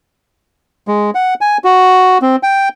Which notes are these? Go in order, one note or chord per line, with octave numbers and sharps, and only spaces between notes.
G#3
F#5
G#5
F#4
C4
G5